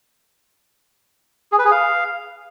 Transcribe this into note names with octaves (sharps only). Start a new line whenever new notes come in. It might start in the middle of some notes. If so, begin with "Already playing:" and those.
G#4
B4
G#4
F5